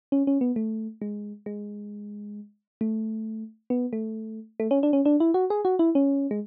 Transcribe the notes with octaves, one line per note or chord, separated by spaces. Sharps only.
C#4
C#4
B3
A3
G#3
G#3
A3
B3
A3
A3
C#4
D4
C#4
D4
E4
F#4
G#4
F#4
E4
C#4
G#3